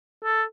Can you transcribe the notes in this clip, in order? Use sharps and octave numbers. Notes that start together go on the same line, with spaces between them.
A4